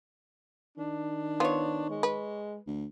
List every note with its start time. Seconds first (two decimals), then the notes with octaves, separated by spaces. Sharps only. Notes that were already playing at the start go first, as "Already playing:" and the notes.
0.78 D#3 D4
1.40 B3 F4 C5 C#5
1.90 G#3
2.03 B4
2.67 D2